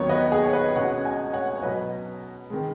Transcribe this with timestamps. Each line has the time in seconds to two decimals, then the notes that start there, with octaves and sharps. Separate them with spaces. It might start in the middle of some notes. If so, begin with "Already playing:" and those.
Already playing: D#2 D#3 F#3 B3 D#4 C#5
0.09 B4 D#5
0.32 G#4
0.44 C#5
0.53 B4 D#5
0.75 C#2 B2 G#3 C#4 C#5 F#5
1.04 D#5 G#5
1.33 C#5 F#5
1.57 C#5
1.62 B1 B2 F#3 B4 D#5
2.50 D#3 G#3